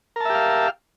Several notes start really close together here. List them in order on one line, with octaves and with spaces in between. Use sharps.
A#4 A5 E5 G4 F5